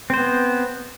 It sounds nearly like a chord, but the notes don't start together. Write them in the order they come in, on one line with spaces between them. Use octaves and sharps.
C4 C5 B3